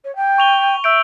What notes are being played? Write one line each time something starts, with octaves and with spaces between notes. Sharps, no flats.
C#5
G5
C#6 F7 G7
E5 E6 G6 D7